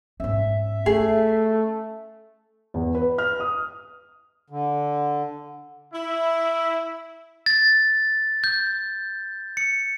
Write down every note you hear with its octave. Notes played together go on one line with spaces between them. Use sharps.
G#2 C#4 E5
A3 C#4 G#4
E2
B4
F6
D#6
D3
E4
A6
G6
C#7